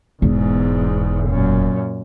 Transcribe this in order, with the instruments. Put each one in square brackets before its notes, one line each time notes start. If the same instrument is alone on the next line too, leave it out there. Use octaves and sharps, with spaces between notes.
[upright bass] E1 [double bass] E2 G#2
[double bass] F#2 A#2